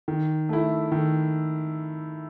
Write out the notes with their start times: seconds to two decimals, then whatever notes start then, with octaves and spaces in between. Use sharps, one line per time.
0.08 D#3
0.49 A3 E4
0.92 D#3